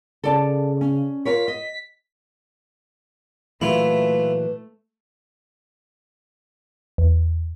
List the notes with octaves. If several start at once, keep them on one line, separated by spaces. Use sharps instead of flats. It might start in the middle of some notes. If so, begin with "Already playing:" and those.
C#3 A4 D5 A5
C#4
F4 A#4 C#5 B6
D#5
A#2 E3 F#3 A3 E4 F4 B4
E2